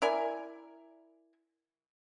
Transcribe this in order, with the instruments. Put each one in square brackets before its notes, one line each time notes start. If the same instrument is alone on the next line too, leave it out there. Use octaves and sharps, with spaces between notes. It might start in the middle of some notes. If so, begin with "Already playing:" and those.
[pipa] E4 A#4 D5 G#5